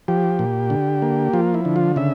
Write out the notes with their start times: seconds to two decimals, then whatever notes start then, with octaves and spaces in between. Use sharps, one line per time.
0.08 F3 G4
0.39 A#2
0.70 D3
1.02 A#3
1.34 F3 F4
1.54 E4
1.65 D3
1.76 F4
1.96 C#3 E5